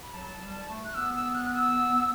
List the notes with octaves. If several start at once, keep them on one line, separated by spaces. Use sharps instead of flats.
B5
F#3 A5
G3
A3
F#6
B3 E6
E6
F#6
F#6
E6